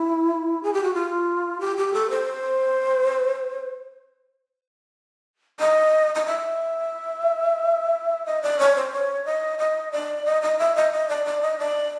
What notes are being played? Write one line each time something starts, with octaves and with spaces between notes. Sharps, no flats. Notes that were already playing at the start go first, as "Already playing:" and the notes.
Already playing: E4
G#4
G4
F#4
F4
G4
G4
A4
C5
D#5
D#5
E5
D#5
D5
C#5
C5
C#5
D#5
D#5
D5
D#5
D#5
E5
D#5
D#5
D5
D5
D#5
D5